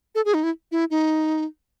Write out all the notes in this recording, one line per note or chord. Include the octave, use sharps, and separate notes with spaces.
A4
G#4
D#4
E4
E4
D#4